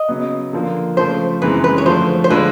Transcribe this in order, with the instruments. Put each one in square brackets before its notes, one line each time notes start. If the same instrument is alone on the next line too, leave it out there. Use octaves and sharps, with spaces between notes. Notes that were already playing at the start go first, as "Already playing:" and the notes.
Already playing: [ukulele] D#5
[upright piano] C#3 F#3 B3
D3 F3 A#3
[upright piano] C#3 F3 A3 [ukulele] C5
[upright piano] F#2 C#3 E3 G#3 C4 [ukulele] B4
[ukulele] B4
C#5
[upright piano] D3 F3 A3 [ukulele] C5
[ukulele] C5
[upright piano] D3 F3 G#3 [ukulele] B4